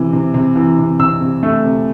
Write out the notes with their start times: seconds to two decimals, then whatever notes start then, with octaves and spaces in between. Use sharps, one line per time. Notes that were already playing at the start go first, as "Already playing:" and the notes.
Already playing: C3 E3
0.13 C3
0.34 C3
0.56 E3
0.79 C3
0.99 C3 E6
1.21 C3
1.43 A3
1.65 C3